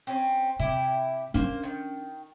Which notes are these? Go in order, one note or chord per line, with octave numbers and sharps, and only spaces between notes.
C4 C#4
C3 E4 G4
A#3 C#4 D4 C5
D#3